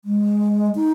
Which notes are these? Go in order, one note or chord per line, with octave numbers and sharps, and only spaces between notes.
G#3
D#4